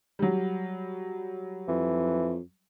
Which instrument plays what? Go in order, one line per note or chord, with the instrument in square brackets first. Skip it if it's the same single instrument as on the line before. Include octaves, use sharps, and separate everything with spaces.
[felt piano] F#3 G3
[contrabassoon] F2 [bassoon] E3